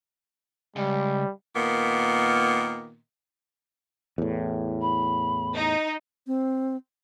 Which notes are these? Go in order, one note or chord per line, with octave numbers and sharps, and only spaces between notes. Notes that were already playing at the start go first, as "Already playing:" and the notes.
C#2 G3
A#2 D#3 A#3 B3
E2 A2
B5
D#4
C4